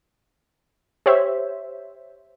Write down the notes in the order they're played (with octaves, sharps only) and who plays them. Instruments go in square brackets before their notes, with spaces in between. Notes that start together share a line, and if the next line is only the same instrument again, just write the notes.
[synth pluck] G4 C5 C#5 E5